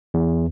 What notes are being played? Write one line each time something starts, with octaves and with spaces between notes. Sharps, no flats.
E2